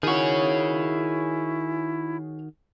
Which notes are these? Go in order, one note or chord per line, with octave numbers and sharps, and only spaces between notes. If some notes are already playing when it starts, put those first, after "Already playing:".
D#3 E4 F#4 G#4 C#5